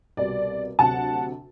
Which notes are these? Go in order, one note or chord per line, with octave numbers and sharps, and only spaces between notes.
C2 B2 G3 D5
D2 C3 F#3 F#5 A5